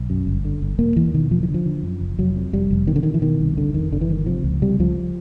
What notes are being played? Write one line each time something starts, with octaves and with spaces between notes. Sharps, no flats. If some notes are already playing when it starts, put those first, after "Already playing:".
Already playing: B1
F#2
G1
D3
G1
E1 A#3
E2 E3
B2 D#3
E1 F3
E3
D3
F3
D3
F#2
F#1
F1 F#3
F2
F1 G3
F1
B2 D#3
D3
B2 D#3
E3
B2 D#3
C2
G1 D3
F2 D#3
G1 D3
E3
G1 D#3
C3 F3
C#2
C3 G3
C#2 F3